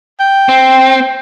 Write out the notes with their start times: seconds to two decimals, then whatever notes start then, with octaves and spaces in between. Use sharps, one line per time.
0.20 G5
0.49 C4